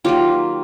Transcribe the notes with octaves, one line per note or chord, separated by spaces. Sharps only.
D#3 F#3 A#3 F4 G4